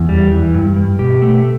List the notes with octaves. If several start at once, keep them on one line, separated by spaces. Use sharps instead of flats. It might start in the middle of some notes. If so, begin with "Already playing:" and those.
Already playing: E2
G3
E3
G2
G2
B2 G4
A3